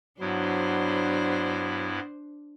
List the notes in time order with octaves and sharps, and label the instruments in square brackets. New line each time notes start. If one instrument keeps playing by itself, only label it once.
[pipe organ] G2 B3 E4 [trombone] F#3 [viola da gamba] D4 C5